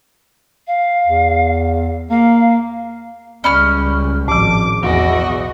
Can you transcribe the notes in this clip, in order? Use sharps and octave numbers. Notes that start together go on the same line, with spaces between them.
F5
E2
A#3 F5
C#2 G3 C#4 D5 B5 F6
G#1 A2 F3 D6
B1 E2 E3 F#4 D#5